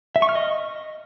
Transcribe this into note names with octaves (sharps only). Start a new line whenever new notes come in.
E5
C#6
F6
D#5